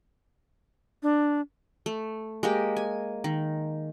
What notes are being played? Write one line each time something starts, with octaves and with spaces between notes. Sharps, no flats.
D4
A3
G#3 A#3 G4
G#5
D#3